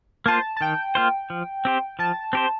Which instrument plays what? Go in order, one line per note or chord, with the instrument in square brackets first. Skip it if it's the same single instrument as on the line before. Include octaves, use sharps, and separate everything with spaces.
[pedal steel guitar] A#3 F4 C5 [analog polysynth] A5
[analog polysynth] A5
[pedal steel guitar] D#3 [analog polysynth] G5
[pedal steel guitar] A#3 F4 C5
F3
C4 G4 C5
[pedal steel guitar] F3 [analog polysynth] A5
[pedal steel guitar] C4 G4 C5